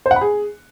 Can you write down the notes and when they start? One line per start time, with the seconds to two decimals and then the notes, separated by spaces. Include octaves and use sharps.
0.06 C5
0.11 F#5
0.16 B5
0.21 G#4